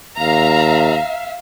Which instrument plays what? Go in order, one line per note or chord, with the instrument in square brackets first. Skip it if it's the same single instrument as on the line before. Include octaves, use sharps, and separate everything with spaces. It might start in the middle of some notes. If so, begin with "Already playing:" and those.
[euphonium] D#2 [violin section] E5 F5 [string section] A#5